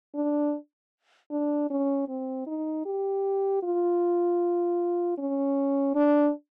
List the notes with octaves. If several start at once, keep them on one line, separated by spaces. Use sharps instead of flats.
D4
D4
C#4
C4
D#4
G4
F4
C#4
D4